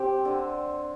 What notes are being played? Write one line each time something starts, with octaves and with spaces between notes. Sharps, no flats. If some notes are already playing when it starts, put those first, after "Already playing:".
Already playing: C4 G4
D3